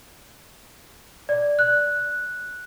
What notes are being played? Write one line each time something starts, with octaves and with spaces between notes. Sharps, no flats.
D5
F#6